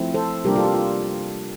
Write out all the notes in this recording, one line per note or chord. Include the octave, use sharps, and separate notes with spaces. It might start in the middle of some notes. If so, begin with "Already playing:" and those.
Already playing: F3 A3 C4 E4
A4 C5
C3 G3 A#3 D4 F4 G4 A#4
F4 A4
G4
F4